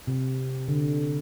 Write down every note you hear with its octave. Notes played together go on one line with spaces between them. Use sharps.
C3
D3